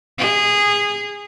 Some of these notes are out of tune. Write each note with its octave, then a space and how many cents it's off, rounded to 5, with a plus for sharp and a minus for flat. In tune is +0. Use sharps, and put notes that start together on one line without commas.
G#4 -20